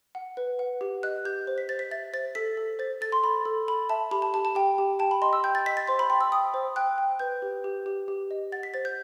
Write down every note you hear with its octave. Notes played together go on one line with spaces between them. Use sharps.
F#5
B4
F#5
G4
D#5 F#6
G4 G6
C5
B6
C5 A6
B6
E5 A6
C5 A6
A4 B6
A4
C5 A6
A4 A6
C6
A4 B5
A4
A4 B5
E5 A5
G4 B5
A5
G4 A5
A5
G4 G5
G4
G5 A5
B5
D#5 C6
E6
G5 G6
A6
D#5 B6
A6
C5 C6
B5
G5 C6
E6
G5 D#6
C5
G5 F#6
G5
B4 G6
G4
G4
G4
G4
D#5
F#5 A6
B6
C5 A6
G6